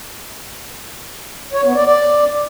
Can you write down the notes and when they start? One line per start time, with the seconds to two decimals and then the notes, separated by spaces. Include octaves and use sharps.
1.53 C#5
1.64 B3
1.75 D5
1.86 D5